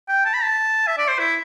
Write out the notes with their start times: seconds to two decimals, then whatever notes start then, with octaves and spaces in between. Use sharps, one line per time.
0.08 G5
0.25 A5
0.34 B5
0.43 A5
0.87 E5
0.98 D5
1.08 C5
1.19 E4